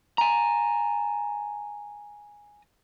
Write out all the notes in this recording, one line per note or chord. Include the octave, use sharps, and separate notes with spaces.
G#5 A#5